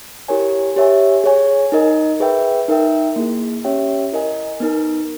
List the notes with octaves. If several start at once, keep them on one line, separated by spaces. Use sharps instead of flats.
E4 G4 A#4 C#5 G#5
G4 C#5 E5 G#5
G#4 C#5 G#5
D#4 A#4 D#5
G#4 B4 E5 G5
D#4 A#4 E5 G5
A#3 E4 G#4
C#4 G4 C#5 E5 G5
E4 A#4 D#5 G#5
B3 D#4 A#4